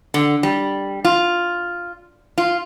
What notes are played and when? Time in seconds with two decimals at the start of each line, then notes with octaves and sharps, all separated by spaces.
0.14 D3
0.43 G3
1.05 F4
2.38 F4